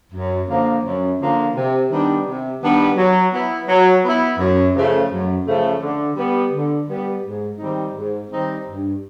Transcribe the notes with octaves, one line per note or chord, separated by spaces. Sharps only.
F#2
D3 F3 A#3
F#2
D3 F3 A#3
C3
D#3 G3 B3 D4
C3
D#3 G3 B3 D4
F#3
B3 E4
F#3
B3 E4
F#2
C#3 F3 A3
F#2
C#3 F3 A3
D3
G3 B3
D3
G3 B3
G#2
D#3 G3 C4 D#4
G#2
D#3 G3 C4 D#4
G2